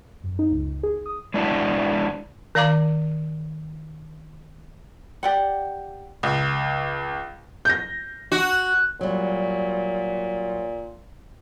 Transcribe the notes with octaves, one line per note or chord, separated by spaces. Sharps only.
F#2
D#4
C#2
G#4
D#6
G#3 D4 E4 F#4
D#3 D5 F5 A#5 D6
G4 D5 F#5
C#2
G6 A#6
F#4
A#2 F#3 G3